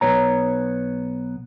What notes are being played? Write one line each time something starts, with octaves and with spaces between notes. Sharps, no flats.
B1 G2 B3 C#5 A#5